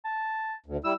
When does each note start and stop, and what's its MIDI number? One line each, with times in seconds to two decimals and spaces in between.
0.05 0.54 81
0.66 0.77 38
0.84 0.93 55
0.84 0.93 64
0.84 0.93 88